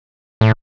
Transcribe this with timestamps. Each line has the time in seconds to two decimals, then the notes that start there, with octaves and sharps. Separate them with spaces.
0.41 A2